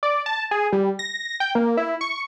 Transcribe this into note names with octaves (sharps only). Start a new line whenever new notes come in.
D5
A5
G#4
G3
A#6
G5
A#3
E4
C#6